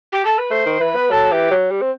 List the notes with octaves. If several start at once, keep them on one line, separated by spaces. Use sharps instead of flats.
G4
A4
B4
A3 C5
D#3
E3 B4
B3
F#3 A4
E3 G4
F#3
G3
C4